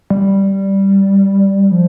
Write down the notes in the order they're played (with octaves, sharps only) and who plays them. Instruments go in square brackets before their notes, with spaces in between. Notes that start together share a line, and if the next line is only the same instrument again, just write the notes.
[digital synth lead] G3
F3